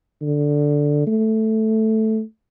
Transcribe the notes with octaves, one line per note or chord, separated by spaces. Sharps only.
D3
A3